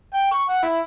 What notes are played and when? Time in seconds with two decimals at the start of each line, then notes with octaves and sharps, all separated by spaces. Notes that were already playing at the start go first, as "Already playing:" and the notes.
0.14 G5
0.31 C#6
0.48 F#5
0.62 E4